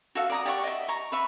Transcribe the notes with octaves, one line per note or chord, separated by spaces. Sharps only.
F#4 A4 E5 F5
D5 A#5 D#6
G4 D5 F#5 C#6
D#5 E5
A#5 C#6
B4 E5 C#6